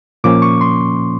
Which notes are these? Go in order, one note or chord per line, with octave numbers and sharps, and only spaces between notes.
A#2 F3 A#3 C#4 D6
C#6
C6